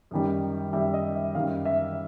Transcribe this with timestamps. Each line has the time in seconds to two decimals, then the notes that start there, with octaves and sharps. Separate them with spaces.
0.11 F#2 D#3 G3
0.73 F#2 D#3 G3 E5
0.94 D#5
1.14 E5
1.35 F#2 D#3 G3 F5
1.65 E5